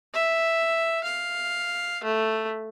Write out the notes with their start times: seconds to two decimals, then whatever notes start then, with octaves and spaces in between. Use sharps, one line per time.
0.14 E5
1.04 F5
2.03 A3